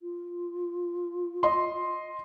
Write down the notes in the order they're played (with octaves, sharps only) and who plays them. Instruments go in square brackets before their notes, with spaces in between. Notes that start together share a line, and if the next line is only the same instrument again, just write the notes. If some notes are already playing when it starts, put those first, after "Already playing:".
[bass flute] F4
[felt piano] D#5 C6